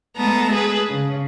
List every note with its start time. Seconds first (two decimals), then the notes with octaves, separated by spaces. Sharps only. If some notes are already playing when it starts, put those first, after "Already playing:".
0.17 G#3 A3 B3 A5 A#5
0.52 G#4 B4 A5
0.90 C#3